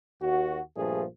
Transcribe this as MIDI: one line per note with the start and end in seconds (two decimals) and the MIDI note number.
0.21 0.60 39
0.21 0.60 66
0.76 1.03 34
0.76 1.03 43
0.76 1.03 46
0.76 1.03 53
0.76 1.03 57
0.76 1.03 68